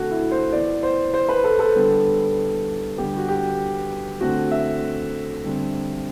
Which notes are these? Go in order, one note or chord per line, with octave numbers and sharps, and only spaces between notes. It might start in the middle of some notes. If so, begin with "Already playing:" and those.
Already playing: D3 A3 C4 F#4 A4
E4
C5
E3 B3 D5
C5
C5
B4
A4
A4
D3 G3 B3
D3 G3 B3 G4
F#4
G4
D3 A3 C4 F#4
E5
D3 G3 C4